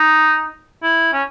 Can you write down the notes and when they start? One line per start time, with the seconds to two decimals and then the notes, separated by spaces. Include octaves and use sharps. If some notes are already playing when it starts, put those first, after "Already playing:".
Already playing: D#4
0.83 E4
1.13 C#4